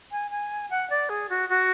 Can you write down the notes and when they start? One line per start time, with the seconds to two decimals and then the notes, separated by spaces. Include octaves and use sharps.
0.12 G#5
0.31 G#5
0.70 F#5
0.90 D5
1.09 G#4
1.29 F#4
1.49 F#4